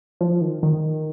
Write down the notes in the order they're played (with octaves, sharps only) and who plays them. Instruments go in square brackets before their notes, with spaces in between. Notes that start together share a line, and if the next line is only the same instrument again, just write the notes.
[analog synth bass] F3
D#3
D#3